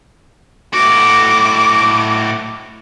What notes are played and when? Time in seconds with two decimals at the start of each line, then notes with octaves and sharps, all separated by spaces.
0.73 A2 F#4 D6